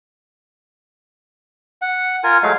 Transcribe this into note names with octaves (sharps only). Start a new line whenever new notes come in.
F#5
F4 A#4 G#5
F#3 G#3 A3 F5